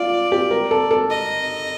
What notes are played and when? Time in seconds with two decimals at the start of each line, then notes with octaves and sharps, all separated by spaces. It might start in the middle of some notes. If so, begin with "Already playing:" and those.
Already playing: F4 D5
0.32 G4
0.51 A#4
0.71 A4
0.91 A4
1.10 D#5